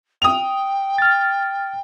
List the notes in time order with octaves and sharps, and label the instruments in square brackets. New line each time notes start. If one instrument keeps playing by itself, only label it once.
[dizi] G5 [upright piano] D#6 F7
[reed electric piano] F6 A6